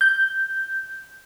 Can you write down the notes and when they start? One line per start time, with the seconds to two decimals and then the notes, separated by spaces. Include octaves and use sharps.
0.01 G6